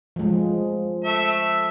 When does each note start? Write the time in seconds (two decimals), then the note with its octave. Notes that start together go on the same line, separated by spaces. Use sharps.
0.16 F3 G#3
1.04 A3 E5